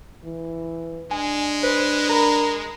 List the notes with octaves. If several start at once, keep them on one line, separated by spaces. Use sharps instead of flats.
E3
G#3 D4 G#5
B4 C5
A#4 A#5 B5